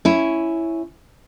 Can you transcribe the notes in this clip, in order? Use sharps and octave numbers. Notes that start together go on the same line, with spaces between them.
C#4 E4